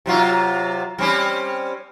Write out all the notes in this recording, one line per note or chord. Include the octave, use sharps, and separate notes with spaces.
C3 F#3 F4
G3 C4 C#4